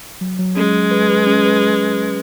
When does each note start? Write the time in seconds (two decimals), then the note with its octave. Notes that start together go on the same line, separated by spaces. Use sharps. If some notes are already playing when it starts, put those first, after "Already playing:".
0.21 F#3
0.39 F#3
0.56 G#3 C#4
0.74 F#3
0.91 B4
1.10 B4
1.27 C#4
1.45 B4